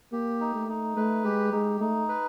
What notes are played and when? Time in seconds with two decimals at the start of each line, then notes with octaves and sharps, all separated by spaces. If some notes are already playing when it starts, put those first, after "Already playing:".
0.12 A#3 G4
0.40 D#4
0.55 A3
0.68 D#4
0.96 A3 B4
1.24 G#3 G4
1.52 G#3 D#4
1.80 A3 D#4
2.09 B4